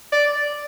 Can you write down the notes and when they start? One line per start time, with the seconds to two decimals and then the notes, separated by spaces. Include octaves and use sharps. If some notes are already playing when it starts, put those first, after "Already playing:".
0.12 D5